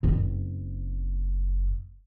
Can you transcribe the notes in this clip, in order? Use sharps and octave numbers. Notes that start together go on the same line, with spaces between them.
F#1 C4